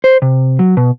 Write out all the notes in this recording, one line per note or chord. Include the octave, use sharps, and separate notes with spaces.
C5
C3
F#3
B2